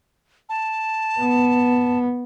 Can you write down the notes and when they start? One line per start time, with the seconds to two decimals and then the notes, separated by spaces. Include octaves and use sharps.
0.49 A5
1.21 B3